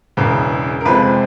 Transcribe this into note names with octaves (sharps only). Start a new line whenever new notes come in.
E1 E2 C#3
A#4
G1 F2 C3 F3 G#3 B4